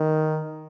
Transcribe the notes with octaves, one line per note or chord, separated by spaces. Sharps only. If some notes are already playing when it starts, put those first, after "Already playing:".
Already playing: D#3